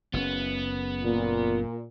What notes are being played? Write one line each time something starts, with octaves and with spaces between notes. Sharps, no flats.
F#1 B2 B3 C#4
A#2